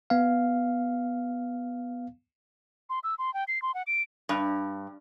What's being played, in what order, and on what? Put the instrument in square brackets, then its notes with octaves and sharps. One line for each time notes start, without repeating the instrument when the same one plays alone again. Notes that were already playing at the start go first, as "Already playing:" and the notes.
[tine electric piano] B3 F5
[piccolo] C6
E6
C6
G5
C7
C6
F#5
D7
[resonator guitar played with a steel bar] G2